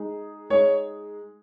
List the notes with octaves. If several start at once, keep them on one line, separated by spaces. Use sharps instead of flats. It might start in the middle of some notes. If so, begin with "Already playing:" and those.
Already playing: G#3 D#4 G#4
G#3 D#4 G#4 C#5